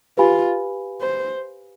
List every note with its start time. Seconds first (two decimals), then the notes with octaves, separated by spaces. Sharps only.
0.18 F4 G4 B4 F5 G#5 B5
1.01 C5